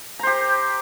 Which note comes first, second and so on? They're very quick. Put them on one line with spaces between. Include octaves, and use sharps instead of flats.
A#5 C5 G4